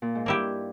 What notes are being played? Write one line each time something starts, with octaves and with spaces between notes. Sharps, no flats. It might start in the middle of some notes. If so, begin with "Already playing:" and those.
A#2
G#2
G2 A#3 E4 G4